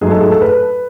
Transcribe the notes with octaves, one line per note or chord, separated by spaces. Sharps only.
G#2 F#3 A3 G#4
A4
G#4
A4
B4